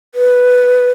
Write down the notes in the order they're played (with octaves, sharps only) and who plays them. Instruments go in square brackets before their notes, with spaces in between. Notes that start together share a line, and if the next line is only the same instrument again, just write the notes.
[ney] B4